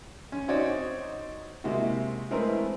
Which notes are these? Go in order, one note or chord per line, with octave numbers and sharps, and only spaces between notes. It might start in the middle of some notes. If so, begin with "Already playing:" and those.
C#4
C4 D#4 F#4 C#5 D5
C3 G#3 A#3 E4 F#4
E3 G#3 A3 C4 A#4 B4